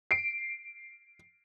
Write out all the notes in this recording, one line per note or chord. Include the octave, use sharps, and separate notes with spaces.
C7 D7